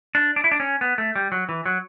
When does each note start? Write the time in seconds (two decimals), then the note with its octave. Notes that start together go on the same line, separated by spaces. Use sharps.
0.15 D4
0.36 D4
0.44 E4
0.51 D4
0.60 C#4
0.81 B3
0.98 A3
1.16 G3
1.32 F#3
1.49 E3
1.66 F#3